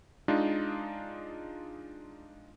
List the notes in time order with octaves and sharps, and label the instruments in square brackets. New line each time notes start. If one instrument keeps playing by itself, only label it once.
[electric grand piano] G#3 D4 D#4 F4